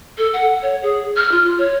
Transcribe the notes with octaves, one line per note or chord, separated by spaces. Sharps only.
A4
F#5
C#5
G#4
F6
F4
C#5